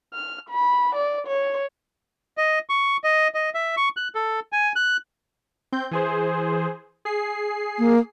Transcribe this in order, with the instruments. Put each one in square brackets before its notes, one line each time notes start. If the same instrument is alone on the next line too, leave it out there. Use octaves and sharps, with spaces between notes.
[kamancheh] F6
B5
D5
C#5
[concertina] D#5
C#6
D#5
D#5
E5
C#6
F#6
A4
G#5
F#6
[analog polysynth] C4 G6
E3 G#4 C5
G#4 C7
[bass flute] A#3